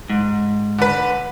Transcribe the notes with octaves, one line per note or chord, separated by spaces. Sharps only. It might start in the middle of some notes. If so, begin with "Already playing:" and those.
G#2
D3 B4